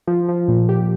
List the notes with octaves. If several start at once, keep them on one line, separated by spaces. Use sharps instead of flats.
F3
F3
A#2
G4